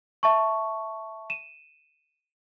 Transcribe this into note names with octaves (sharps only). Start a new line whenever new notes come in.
E5 A5 C#6
D#7 E7